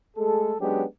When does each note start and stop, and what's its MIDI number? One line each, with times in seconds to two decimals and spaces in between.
0.17 0.54 56
0.17 0.54 57
0.17 0.54 68
0.17 0.54 69
0.60 0.84 54
0.60 0.84 56
0.60 0.84 59
0.60 0.84 61
0.60 0.84 62
0.60 0.84 67